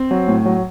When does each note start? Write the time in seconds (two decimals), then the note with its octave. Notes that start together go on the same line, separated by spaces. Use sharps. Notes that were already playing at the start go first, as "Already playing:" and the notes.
Already playing: C4
0.11 F#3
0.28 A2
0.45 F#3